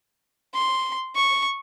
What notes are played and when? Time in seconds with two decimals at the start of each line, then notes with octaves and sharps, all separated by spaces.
0.54 C6
1.16 C#6